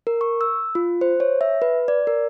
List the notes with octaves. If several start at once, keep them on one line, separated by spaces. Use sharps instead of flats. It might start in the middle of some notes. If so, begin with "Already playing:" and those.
A#4
C#6
E6
F4
C5
C#5
E5
B4
D5
A#4